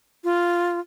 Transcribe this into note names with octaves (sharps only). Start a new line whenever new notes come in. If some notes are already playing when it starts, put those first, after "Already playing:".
F4